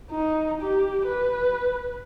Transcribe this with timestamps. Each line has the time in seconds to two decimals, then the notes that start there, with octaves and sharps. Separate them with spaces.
0.11 D#4
0.62 G4
1.07 B4